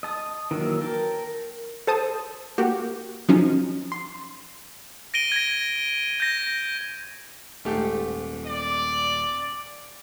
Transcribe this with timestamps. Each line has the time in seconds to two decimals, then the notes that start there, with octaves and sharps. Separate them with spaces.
0.03 D#5 A5 D#6
0.51 D#3 E3 F#3 A#3
0.81 A#4 G5 A5
1.87 A4 C5 A5 D#6
2.58 A#3 F#4 G4
3.29 F3 F#3 C#4 D#4
3.92 C6
5.14 A#6 D7 D#7 G7
5.32 G#6 A#6
6.20 G6 A#6
7.65 D#1 G#2 A3 G4
8.46 D5